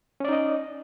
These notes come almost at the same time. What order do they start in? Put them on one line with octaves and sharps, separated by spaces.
C#4 D5 D#4 D#5